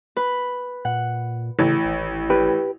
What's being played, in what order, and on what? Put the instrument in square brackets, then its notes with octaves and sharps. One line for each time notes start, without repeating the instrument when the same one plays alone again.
[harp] B4
[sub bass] A#2 [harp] F#5
[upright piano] A1 [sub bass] C#3
[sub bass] G#1
[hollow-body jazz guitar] G4 B4